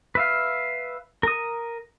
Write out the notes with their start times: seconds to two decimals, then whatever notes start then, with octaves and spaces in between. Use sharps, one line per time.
0.15 B4 E5 F5
1.23 A#4 D#6